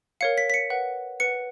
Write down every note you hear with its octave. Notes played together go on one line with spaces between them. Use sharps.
A#4 C#5 F5 C#7
B6
B6
C#7
B4 F#5
B4 F#5 C#7